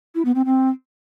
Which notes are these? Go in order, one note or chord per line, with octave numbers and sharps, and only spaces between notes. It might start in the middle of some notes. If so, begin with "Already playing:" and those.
E4
B3
C4
C4